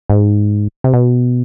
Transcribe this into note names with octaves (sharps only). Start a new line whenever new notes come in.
G#2
C3
B2